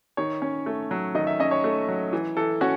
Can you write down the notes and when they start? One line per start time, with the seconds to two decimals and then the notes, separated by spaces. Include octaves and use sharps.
0.17 D#3 C#5
0.42 C#4
0.66 A3
0.91 F#3
1.15 D#3 D#5
1.27 E5
1.40 C#4 D#5
1.51 C#5
1.64 A3
1.88 F#3
2.13 E3
2.37 E3 A4
2.61 C#4 F#4